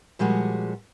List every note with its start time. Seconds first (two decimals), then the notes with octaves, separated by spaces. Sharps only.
0.19 A#2 F3 G3 G#3 F#4